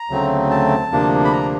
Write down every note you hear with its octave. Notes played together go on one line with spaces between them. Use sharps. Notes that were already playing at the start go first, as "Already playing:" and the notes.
Already playing: A#5
D2 C#3 F#3 A3 C4
A5
D2 C3 F3 A#3 D4
B5
A#5